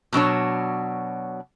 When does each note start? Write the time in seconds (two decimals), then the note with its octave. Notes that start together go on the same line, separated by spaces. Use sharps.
0.13 B2 F#3 D4 C#5